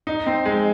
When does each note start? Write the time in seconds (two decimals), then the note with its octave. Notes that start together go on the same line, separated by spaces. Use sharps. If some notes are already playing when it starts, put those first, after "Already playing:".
0.07 D#4
0.27 C4
0.46 G#3